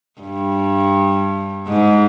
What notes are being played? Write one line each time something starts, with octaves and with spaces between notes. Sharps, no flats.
G2
G#2